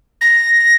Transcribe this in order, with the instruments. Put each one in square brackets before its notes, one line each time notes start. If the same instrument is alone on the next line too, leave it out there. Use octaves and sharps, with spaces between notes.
[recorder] A#6